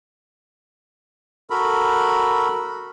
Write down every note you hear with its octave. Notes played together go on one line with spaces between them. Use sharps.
F#4 A4 A#4 B5